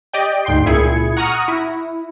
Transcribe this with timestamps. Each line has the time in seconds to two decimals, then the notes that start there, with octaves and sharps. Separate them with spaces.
0.13 G4 D5 D#5 G5
0.45 D2 G#2 G5 C6 C7
0.66 C#2 A#2 E4 G#4 G#6 C#7
1.17 F#5 A#5 C#6 D#6 F6 A#6
1.48 E4